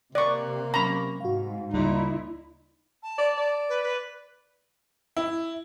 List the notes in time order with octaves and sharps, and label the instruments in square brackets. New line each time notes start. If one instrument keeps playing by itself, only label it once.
[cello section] C3 [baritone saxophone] A#3 [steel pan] D5 C#6 [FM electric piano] F#6
[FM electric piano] F#3 C#4 C#6 [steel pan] A#5 B5
[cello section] G#2 [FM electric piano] F#4 F5
[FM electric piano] D2 C#3 G3 [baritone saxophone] A#2 [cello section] D#4 E4
[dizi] A5
[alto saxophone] D5
D5
[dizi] B4
B4
[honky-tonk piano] E4